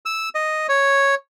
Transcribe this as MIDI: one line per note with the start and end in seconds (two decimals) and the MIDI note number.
0.06 0.29 88
0.35 0.67 75
0.69 1.15 73